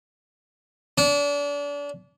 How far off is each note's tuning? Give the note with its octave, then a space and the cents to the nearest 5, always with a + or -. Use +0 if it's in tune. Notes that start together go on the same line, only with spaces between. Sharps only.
D4 -35